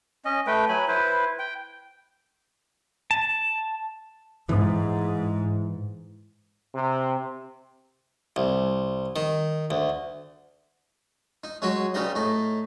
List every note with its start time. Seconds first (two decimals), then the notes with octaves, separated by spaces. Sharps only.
0.25 C#4 D#5
0.47 A3 B4 G5
0.69 F#3 G#5 B5
0.88 E4 B4 C5
1.39 G5
3.11 A5
4.49 G#2 E3
6.75 C3
8.36 C2
9.16 D#3
9.71 D2
11.44 D#4
11.62 F#3 G#3 D#4 F#4
11.94 C#2 G3 D#4 D#5
12.15 A2 D#4